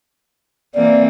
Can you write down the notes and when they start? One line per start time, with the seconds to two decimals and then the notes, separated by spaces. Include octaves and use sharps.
0.75 E3 A#3 C4 D5